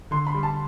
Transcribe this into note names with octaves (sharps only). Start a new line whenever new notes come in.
D3 C6
B5
G3
A5